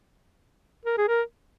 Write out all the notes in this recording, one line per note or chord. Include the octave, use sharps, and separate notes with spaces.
A#4
G#4
A#4